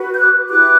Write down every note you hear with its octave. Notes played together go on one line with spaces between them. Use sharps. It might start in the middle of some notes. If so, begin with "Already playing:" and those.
Already playing: F#4 B4
G6
D6 F#6
E4 G4 B4 D6 F#6